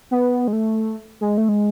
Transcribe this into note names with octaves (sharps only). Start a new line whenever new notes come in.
B3
G#3
A3
G#3
A3
G#3